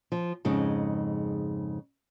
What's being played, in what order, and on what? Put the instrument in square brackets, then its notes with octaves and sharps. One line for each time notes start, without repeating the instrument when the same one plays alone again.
[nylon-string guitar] F3
F2 G#2 C#3 D#4